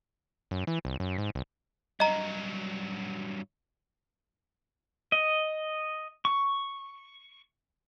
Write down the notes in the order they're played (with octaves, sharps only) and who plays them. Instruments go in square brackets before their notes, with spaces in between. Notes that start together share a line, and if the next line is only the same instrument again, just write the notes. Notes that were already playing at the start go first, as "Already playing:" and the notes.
[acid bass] F#2
E3
C2
F#2
G#2
C2
[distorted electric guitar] G2 F#3 [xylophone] D#5 A#5
[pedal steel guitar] D#5
C#6